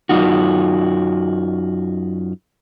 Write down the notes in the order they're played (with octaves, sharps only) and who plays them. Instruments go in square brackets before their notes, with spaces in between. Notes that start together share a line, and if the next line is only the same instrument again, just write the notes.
[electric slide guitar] F#2 D#4 F4 F#4